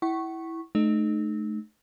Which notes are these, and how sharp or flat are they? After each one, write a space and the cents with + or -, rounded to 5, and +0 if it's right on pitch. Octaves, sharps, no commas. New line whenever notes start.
E4 -5 F#5 +40 C#6 -10
A3 -30 D#4 -30